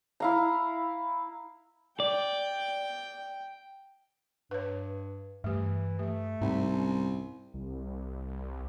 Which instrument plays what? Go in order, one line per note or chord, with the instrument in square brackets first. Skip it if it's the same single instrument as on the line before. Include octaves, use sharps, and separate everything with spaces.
[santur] E4 F5 A#5
[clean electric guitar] D5 [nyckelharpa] G5
[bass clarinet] G2 [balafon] B4 C#5
[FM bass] G2 [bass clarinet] E3 [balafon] A3 G4
[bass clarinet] A3 [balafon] G4
[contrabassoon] C2 [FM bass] G#2 [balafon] D#4
[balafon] C#4
[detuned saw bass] C2